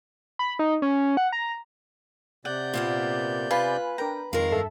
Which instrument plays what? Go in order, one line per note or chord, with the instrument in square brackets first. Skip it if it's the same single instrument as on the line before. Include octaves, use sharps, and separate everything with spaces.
[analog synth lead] B5
D#4
C#4
F#5
A#5
[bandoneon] C3 D5 G6 [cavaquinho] F#5
[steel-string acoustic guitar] A#2 A#3 B3
[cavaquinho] F4 [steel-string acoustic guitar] B4 [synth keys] G#5 B5
[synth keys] D4 A#4 G5 [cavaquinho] A#5
[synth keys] F2 [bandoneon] D#3 F5 [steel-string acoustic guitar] G#3 A#4
[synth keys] G2 A4 E5